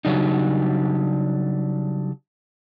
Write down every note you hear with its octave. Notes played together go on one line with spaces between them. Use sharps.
C#3 F#3 G3 D4 D#4